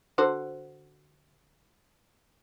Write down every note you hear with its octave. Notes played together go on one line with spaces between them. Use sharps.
D3 F#4 C5